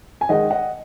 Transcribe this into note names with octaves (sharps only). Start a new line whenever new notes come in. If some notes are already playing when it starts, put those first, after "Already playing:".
G#5
D#3 G#3 D#4 D#5 F#5
D#5 F#5